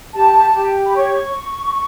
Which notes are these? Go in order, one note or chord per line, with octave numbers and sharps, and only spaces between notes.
G4 A5
G4
B5
C#5 C#6